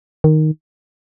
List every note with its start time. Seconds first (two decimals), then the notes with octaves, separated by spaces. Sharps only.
0.24 D#3